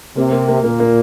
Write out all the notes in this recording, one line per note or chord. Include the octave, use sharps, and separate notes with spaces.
C3 A#3
A#3
A#3
A#2 A#3
A#3